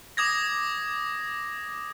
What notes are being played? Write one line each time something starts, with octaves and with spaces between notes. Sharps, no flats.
D6 D#6 G#6 A#6